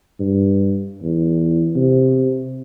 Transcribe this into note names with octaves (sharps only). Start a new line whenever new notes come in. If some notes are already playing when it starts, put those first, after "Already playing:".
G2
E2
C3